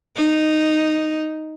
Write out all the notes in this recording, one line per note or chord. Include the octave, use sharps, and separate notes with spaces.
D#4